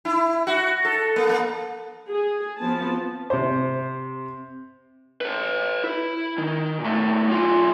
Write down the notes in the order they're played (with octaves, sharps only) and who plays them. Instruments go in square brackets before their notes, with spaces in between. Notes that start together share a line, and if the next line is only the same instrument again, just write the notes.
[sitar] E4
F#4
A4
A#3
A#3
[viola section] G#4
F3 B3 C4 A5
[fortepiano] C3 C5
[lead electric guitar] A4 B4
E4
D#3
A#2 A3
B1 F4